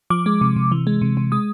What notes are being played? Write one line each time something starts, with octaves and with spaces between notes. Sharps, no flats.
F3 D6
G#3
C3
C3
E3
G#3
C3
C3
G#3 D#6